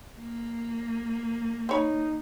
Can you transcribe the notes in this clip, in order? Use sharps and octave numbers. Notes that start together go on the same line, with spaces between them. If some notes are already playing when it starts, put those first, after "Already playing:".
A#3
C4 D#4 C#5 B5